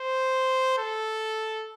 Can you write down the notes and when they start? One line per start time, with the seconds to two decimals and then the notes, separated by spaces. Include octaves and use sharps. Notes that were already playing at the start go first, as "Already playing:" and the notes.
Already playing: C5
0.78 A4